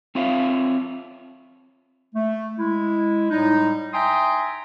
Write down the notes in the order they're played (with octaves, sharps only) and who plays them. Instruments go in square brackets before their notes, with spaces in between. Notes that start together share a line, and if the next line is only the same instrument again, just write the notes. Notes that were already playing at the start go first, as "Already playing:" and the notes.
[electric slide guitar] C4 F4 C#5 E5 F5
[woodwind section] A3
G#3 E4
A2 G3 G#3 D#4
E5 G5 G#5 A#5 C6 D#6